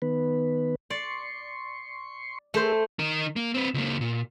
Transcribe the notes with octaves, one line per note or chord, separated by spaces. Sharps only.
D#3 B3 B4
D5 C6 C#6
A3 G#4 A#4 C5 E5
D#3 A#4
A#3
C4 B4
C#2 A#3
A#2